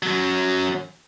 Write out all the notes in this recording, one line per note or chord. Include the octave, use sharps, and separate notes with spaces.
F#2 F#3